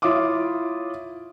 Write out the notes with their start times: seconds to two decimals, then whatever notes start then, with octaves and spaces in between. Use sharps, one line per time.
0.02 E4 F4 C#5 F5 D6 D#6